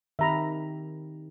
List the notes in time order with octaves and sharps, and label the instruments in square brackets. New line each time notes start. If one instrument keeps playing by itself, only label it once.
[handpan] D#3 C4 G4 [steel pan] E5 A#5 B5